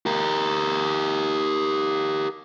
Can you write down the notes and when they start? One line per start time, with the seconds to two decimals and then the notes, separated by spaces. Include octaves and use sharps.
0.06 G4 A#4